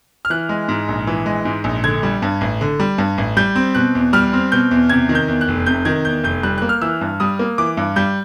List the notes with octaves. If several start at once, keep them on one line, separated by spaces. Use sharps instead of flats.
F6
E3 F#6
G#3
G#2
A#1
E3
G#3
G#2
A#1
D3 G#6
G3
G2
A1
D3
G3
G2
A1
G3 G6
C4
B2 F#6
E2
G3 F6
C4
B2 G6
E2
C3 G#6
D#3
G6
E2
F#6
F1
C3 G6
D#3 G#6
E2 G6
F1 G6
G3 F#6
A#3 F#6
F6
E3 E6
G2
G3 D#6
A#3
E3 D6
G2
G3 G6